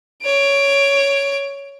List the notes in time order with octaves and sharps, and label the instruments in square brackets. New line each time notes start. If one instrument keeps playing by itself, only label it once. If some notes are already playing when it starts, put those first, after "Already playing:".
[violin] C#5 D7